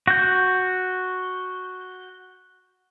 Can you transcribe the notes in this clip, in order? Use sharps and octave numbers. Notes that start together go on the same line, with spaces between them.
F#4 G6